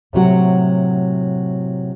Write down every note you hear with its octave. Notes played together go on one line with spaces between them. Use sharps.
A2 C3 F#3 F#4